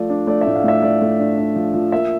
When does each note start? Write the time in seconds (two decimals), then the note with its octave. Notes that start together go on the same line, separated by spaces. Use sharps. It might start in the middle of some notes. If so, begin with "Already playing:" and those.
Already playing: F3 A3 D5
0.10 D4
0.27 A3 D5
0.41 E5
0.46 A2
0.55 F5
0.64 A2 E5
0.82 A3 D5
1.01 A3
1.20 D4
1.38 D4
1.56 F3
1.74 F3
1.92 A#3 E5